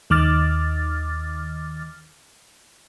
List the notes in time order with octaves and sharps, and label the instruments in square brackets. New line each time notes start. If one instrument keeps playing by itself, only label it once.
[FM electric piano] D#2 D#3 D6 F6 A6